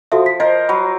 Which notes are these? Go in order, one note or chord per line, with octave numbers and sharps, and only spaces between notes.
F3 F#4 A4 E5
B6
A#4 C5 D#5
F#3 B5